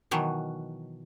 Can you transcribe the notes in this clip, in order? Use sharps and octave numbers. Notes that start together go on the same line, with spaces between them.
B2 D#3 E3 F#3